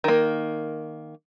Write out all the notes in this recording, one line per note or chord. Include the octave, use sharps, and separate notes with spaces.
D#3 A#3